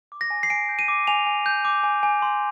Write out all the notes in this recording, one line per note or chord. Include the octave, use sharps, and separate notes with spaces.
D6
A#6
G#5
C7
G#5 D7
G6
D#7
D6
G#5 F7
G#5
G6
D6
G#5
G#5
C6